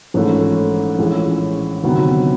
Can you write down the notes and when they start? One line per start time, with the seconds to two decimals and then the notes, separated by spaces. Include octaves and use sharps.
0.14 A#1 G#2 E3 A3 C#4
0.99 A#1 A2 E3 G#3 C#4
1.84 D2 C3 D#3 F#3 B3